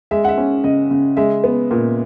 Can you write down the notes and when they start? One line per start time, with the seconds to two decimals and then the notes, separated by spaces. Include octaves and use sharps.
0.11 G#3 E5
0.25 F#5
0.28 E5
0.38 C#4
0.64 C#3 D#5
0.91 C#3
1.17 G#3 E5
1.44 B3
1.71 A#2